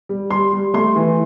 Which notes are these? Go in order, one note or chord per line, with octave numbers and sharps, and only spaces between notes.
G3
G3 C6
G3
A3 C6
E3